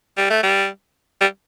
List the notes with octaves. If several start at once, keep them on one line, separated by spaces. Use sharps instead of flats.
G3
A3
G3
G3